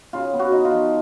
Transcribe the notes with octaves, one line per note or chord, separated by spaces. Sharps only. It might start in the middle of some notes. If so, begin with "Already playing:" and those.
C#3 F4
B3
F#4
D#4
F4
F3